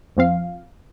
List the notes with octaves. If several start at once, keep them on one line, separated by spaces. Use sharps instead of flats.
F2 F3 C4 F5